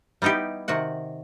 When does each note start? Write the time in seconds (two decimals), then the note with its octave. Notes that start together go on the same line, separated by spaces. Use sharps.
0.22 G3 B3 D#4 E4 G4
0.68 C3 D#3 F#4 F#5